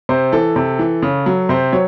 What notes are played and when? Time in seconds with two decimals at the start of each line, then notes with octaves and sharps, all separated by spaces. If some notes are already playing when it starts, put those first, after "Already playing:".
0.09 C3 C5
0.32 E3 A4
0.56 C3
0.79 E3
1.02 C#3
1.26 F#3
1.49 C3 C5
1.73 F#3 C#5